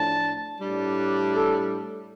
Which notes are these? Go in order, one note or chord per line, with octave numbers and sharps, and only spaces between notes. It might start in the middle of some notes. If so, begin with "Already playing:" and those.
Already playing: A2 F3 D4 A5
A2 G3 D4
A4